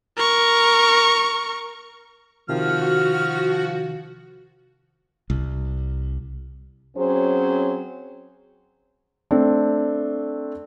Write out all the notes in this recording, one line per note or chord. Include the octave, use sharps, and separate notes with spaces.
A#4 C#6
C3 D#3 F3 F#4 F6
C2
F#3 C4 C#4 G#4 C5
A3 C4 D4